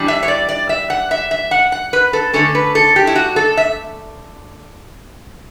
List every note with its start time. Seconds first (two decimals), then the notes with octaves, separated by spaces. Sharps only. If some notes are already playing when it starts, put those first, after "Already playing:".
Already playing: E3 G3 D4
0.08 E5
0.23 C#5
0.28 D5
0.49 D5
0.69 E5
0.90 F#5
1.11 E5
1.31 E5
1.51 F#5
1.72 F#5
1.93 B4
2.13 A4
2.33 D3 A3 C#4 A4
2.55 B4
2.75 A4
2.96 G4
3.07 E4
3.16 F#4
3.36 A4
3.57 E5